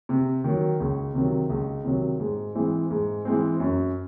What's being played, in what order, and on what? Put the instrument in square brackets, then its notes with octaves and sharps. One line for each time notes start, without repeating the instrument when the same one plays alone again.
[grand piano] C3
D#3 F#3
C#2
C3 D#3 F#3
C#2
C3 D#3 F#3
G#2
E3 G#3 C4
G#2
E3 G#3 C4
F#2